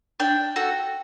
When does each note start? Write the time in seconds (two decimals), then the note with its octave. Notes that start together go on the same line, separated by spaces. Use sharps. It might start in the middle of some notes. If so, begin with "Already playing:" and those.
0.20 D4 G5
0.56 F#4 A4